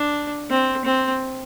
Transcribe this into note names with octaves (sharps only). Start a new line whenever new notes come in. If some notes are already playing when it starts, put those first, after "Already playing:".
Already playing: D4
C4
C4